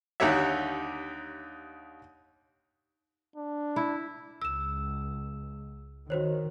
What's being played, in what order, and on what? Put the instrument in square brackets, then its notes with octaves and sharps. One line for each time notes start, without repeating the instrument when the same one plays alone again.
[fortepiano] D#2 D3 D#4 G4 C#5 E5
[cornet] D4
[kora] E4
[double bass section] C#2 [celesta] E6 E7
[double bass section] D#3 [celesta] F#4 C5 C#5